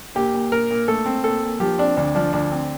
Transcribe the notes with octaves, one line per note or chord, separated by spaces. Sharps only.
A#2 G4
A#2
A#2 A#4
A#2
A3 A4
C4
A#2 A4
A#2
F3 G4
C4 D4
D2 D4
F3 D4
D2 D4
C4